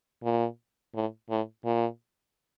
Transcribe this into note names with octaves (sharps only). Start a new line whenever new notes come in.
A#2
A2
A2
A#2